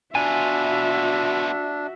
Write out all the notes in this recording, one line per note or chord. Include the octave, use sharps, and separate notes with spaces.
B2 D4 F4 F#4 E5 G#5